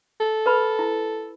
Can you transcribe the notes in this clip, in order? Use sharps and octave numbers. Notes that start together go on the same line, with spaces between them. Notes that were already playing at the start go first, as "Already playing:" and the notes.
A4
A#4 B4 B5
E4